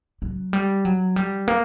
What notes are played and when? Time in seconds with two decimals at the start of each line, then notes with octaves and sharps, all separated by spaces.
0.22 F#3
0.53 G3
0.85 F#3
1.16 G3
1.48 A#3